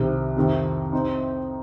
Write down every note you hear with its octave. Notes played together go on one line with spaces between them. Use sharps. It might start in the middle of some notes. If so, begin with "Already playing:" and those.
Already playing: C2 C3 D#3
F2 C3 D#3
C4 D#4